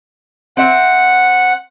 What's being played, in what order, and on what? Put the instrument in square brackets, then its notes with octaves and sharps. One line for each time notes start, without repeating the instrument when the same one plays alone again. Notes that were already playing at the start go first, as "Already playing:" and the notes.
[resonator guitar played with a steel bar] C4 E5 [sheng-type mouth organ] F#5